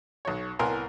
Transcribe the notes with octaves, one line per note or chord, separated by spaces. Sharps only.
B1 C#5
C2 A2 B3 A#4 G#5 C6